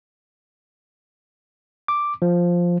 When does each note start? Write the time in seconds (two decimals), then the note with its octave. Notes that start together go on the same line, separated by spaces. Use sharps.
1.88 D6
2.22 F3